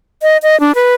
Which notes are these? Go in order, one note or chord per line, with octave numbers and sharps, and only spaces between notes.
D#5
D#5
D4
B4